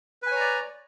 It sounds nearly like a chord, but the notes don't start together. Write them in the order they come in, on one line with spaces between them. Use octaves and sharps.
B4 G#5 C#5 A#5 D5